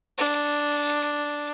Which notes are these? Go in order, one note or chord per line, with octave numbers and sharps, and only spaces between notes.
D4